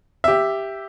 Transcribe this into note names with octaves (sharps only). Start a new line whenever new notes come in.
G4 E5